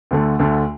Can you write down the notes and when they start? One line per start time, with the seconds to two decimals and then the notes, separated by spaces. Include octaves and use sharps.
0.11 D2 D3 A3
0.39 D2 D3 A3